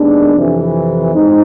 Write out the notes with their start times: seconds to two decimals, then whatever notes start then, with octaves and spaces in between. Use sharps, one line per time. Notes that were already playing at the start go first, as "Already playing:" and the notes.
Already playing: D#2 D#3 G#3 B3 D4
0.35 F2 C3 E3
1.13 G#2 F3 G#3 C4 D#4